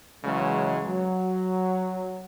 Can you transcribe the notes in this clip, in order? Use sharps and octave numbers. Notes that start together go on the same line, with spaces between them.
C#3 E3 F#3 G#3
F#3